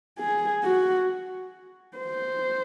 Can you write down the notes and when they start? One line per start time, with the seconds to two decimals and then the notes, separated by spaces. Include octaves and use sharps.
0.20 G#4
0.63 F#4
1.97 C5